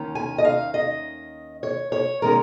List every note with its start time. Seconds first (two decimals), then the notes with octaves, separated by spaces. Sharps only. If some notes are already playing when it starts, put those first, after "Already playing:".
Already playing: D#2 D#3 C#4
0.15 G#5
0.38 D#5
0.45 F5
0.74 D#5
1.63 C#5
1.92 C#5
2.22 D#3 G#3 C#4 A#4